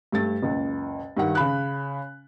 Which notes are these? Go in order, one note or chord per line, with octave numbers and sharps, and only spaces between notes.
G2 A3 A6
F#1 C#2
G2 D#3 F#5
C#3 B5 F#6